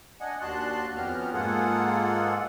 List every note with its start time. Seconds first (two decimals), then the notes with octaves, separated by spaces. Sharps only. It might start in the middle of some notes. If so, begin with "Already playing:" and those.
0.21 D4 D#5 F#5 G#5
0.41 D#2 D4 F#4 A5 C6 F#6
0.96 F2 B3 C#4 F#4 G4 F6
1.33 G#2 A#3 F4 G#4 A4 F#5